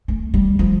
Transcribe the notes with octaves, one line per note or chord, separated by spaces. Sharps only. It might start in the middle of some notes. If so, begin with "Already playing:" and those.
A3
G3
F3